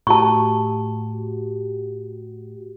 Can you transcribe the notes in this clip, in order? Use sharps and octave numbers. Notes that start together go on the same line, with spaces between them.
A2 F#4 G4 A5 C#6